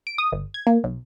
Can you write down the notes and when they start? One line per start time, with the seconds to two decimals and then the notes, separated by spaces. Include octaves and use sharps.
0.07 D7
0.18 D#6
0.32 G1
0.54 G#6
0.67 A#3
0.84 B1